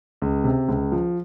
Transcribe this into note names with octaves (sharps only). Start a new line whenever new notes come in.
C#2
C3
C#2
F3